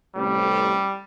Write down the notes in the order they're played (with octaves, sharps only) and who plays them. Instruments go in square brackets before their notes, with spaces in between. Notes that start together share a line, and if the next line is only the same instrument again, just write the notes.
[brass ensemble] A1 C3 [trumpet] G3